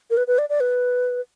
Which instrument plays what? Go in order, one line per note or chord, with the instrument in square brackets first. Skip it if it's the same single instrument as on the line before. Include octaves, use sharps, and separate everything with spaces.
[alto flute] A#4
B4
B4
D5
D5
B4